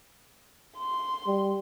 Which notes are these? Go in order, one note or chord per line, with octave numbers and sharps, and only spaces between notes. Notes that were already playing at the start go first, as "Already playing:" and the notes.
C6
G3